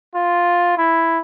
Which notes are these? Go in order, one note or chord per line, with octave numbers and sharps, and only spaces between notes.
F4
E4